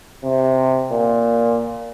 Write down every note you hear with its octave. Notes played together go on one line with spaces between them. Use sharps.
C3
A#2